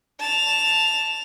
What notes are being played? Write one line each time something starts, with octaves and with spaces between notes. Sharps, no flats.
A5 F7